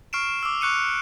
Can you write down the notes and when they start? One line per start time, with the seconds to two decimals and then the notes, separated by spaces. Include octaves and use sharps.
0.13 C#6 F6 C7 D7 E7
0.43 D6 E6
0.61 C#6 F#6 C#7 D#7